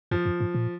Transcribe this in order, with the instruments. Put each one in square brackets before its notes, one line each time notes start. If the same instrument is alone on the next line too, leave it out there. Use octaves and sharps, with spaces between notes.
[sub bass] F#2 [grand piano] F3
[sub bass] F#2
G#2
A#2